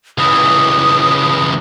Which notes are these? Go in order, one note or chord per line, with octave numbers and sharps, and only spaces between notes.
C#2 E3 D#6